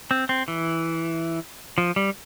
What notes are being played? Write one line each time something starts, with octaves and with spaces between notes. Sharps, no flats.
C4
C4
E3
F3
G3